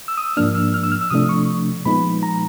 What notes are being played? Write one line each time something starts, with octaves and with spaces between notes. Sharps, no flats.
E6
D#6
E6
G#2 F3 A#3 D4 F6
E6
F6
E6
F6
E6
C3 F3 A3 D4 D#6
C#6
A#2 F3 G#3 B3 D#4 B5
A#5